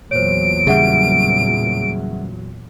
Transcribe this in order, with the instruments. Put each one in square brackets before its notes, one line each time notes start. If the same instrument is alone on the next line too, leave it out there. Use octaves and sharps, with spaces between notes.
[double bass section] E2 A#2 F#3 [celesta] C5 C#5 [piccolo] D7
[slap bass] C#3 G3 [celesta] G#4 E5 F#5